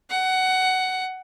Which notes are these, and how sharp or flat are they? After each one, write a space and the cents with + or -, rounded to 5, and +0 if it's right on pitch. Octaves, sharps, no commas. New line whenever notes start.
F#5 +15